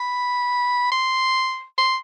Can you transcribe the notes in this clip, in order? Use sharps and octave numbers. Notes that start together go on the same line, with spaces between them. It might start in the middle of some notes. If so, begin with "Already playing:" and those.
Already playing: B5
C6
C6